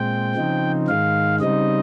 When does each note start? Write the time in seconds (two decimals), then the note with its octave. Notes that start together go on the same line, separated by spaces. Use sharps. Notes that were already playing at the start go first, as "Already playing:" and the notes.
Already playing: A#2 G#3 C4 G5
0.35 C#3 F3 C4 D#4
0.88 G#2 D#3 G#3 F5
1.41 C#3 G3 C4 D#4 D#5